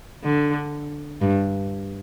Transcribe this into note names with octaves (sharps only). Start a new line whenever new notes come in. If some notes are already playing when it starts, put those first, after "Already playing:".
D3
G2